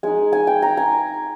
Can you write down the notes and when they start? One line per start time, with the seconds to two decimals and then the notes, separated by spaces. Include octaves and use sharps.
0.03 G#3 D#4 G#5
0.33 G#5
0.47 G5
0.62 A#5
0.77 G#5